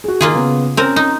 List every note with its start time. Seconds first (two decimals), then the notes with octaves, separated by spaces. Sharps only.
0.04 F#4 G#4
0.21 D#3 A#3 F4 G#4 A#4
0.35 C#3 B3
0.77 C4 C#4 A#4
0.96 D#4